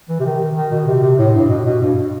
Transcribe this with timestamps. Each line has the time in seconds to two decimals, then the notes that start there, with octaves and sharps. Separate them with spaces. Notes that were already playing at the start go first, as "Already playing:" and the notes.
0.09 E3
0.20 C3
0.25 D#3
0.56 D#3
0.71 B2
0.87 C3
1.03 C3
1.18 A2
1.34 G2
1.49 B2
1.66 B2
1.80 G2